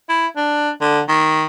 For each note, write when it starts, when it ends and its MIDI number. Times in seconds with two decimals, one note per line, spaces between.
0.09 0.27 64
0.36 0.70 62
0.81 1.01 50
1.08 1.46 51